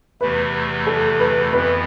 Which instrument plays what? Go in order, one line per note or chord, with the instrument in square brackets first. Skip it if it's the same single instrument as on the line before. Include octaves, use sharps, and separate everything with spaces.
[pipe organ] E2 C3 E3 A3 [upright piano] B4
[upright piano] A4
B4
[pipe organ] F2 E3 B3 [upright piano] B4